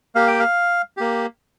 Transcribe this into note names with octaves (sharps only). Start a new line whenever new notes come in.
A#3 G4 F5
G5
F5
A#3 G4